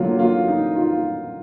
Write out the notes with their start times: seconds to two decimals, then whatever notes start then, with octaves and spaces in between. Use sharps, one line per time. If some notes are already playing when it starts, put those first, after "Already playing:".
Already playing: D3 F#3 A#3 F4
0.19 F4
0.48 D#4
0.76 F4